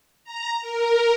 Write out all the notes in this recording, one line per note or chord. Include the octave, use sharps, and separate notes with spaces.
A#5
A#4